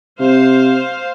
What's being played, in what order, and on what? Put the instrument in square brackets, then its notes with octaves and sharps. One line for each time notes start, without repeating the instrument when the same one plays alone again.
[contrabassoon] C3 [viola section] C5 F5